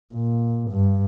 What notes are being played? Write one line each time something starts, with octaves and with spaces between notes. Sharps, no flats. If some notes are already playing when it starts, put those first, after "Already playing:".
A#2
G2